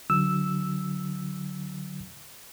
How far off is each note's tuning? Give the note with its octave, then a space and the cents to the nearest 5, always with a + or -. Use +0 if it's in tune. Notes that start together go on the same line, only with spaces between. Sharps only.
D3 +0 F#3 +0 E6 +0